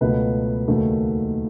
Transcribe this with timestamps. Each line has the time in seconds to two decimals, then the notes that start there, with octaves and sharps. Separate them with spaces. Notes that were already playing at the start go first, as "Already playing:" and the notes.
0.01 C#2 B2 F#3 A3 B4
0.68 D#2 C#3 F#3 A3